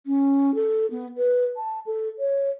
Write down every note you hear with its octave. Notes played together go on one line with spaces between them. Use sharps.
C#4
A4
B3
B4
A5
A4
C#5